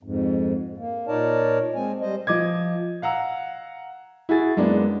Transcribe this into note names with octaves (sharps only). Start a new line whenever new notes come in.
F2 G#2
A#3
A#2 D#4 A#4 C#5 D5 A5
G#3 C4 G#5
G3 C5 D#5
F3 D#5 D6 G#6
F5 F#5 A#5 E6
E4 F#4 G#4 A6
F#2 G#3 A#3 B3 D4